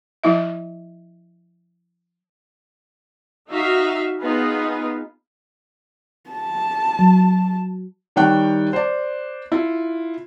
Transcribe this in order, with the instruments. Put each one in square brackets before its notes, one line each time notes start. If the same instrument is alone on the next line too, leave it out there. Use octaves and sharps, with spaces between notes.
[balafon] F3 E4 E5
[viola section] D#4 F#4 E5 F5
B3 D#4 F4 G#4 B4
[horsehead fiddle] A5
[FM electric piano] F#3
[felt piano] D#3 G3 C#5 G5 F#6
C5 D5
E4 F4